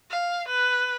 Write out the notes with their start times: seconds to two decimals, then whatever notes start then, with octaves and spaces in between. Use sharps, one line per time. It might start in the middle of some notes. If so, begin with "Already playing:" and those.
0.10 F5
0.48 B4